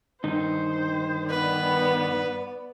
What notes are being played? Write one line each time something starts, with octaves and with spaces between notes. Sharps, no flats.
G2 D#3 D#4 C5
B3 B4 D5